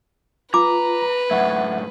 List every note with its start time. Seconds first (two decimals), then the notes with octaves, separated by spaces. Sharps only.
0.54 F4 B4 A#5 D6
1.31 F#2 A2 E5 F#5